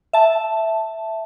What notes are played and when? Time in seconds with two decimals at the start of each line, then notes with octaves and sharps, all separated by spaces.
0.13 E5 A5